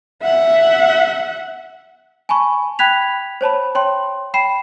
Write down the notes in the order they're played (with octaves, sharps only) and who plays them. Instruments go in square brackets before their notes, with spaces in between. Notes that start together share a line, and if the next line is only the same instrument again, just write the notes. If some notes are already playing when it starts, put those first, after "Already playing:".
[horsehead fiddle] E5 F#5
[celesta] G#5 A5 B5 C#6
G5 B5 F#6 G#6 B6 F7
C5 C#5 A5 B5
C#5 G5 C6
G5 B5 C7 E7